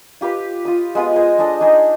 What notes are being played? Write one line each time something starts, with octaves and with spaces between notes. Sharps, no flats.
F4 G4 B4 F5
F4 D6 D#6
G#3 B3 F4 D#6
G#4 C5 D#5 F#5
G#3 D4 A4 D#5
D4 D#4 G#4 G5